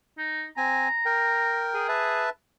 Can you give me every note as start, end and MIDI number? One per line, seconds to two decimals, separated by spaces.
0.18 0.45 63
0.57 0.88 60
0.57 0.88 80
0.57 1.65 82
1.06 1.87 70
1.06 1.87 79
1.74 2.24 68
1.89 2.30 71
1.89 2.30 76
1.89 2.30 81